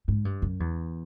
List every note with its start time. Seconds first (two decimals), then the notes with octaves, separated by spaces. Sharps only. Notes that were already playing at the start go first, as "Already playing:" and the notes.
0.08 G#2
0.25 G2
0.42 F#2
0.60 E2